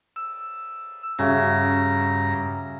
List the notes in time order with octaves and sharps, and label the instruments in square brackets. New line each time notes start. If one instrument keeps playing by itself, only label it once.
[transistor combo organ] E6
[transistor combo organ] G2 A#5 [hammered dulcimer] C#3 F#4 E5